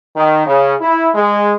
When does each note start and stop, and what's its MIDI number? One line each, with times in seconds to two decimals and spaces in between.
0.16 0.45 51
0.46 0.75 49
0.81 1.10 64
1.15 1.54 56